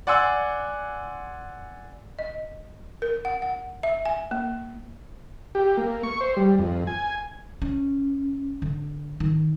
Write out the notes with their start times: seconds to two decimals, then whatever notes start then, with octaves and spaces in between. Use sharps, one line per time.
0.07 D5 F#5 G#5 C6 E6
2.19 D#5
3.02 A#4
3.25 F#5
3.42 F#5
3.83 E5
4.05 G#5
4.31 A#3
5.55 G4
5.77 A#3
6.03 C#6
6.21 C5
6.37 G3
6.59 F2
6.87 G#5
7.62 C#4
8.62 D3
9.20 D#3